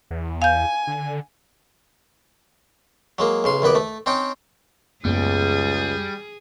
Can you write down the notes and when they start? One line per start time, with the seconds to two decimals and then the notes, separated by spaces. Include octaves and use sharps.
0.11 E2
0.42 F5 G#5 G6
0.87 D3
3.18 F#3 G#3 A#3
3.44 B1 C#3 C6
3.62 A#1 D#2 B3 B4 D6
3.75 A3
4.06 C4 C#4 D#4 G5
5.05 C#2 F#2 G3 A#3 B3 G#4